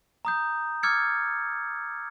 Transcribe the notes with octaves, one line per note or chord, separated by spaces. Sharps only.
A#5 D#6 G6
D6 E6 F6 G#6 A6 C#7